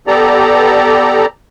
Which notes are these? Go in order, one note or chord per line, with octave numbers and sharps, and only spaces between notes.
B3 G4 A4 D5 A#5